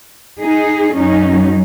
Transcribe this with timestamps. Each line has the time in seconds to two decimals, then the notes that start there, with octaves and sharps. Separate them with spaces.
0.40 D#4 G#4
0.95 F#2 F#3 C#4 D#4